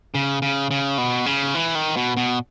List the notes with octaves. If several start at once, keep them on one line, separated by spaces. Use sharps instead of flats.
C#3
C#3
C#3
B2
C#3
E3
D#3
B2
B2